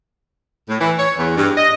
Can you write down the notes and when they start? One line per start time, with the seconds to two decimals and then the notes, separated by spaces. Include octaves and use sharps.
0.69 A2
0.81 E3
0.99 C#5
1.18 E2
1.37 G2
1.57 D#5